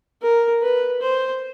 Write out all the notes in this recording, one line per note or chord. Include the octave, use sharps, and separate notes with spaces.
A#4
B4
C5